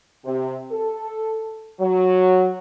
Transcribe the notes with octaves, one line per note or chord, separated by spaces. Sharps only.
C3
A4
F#3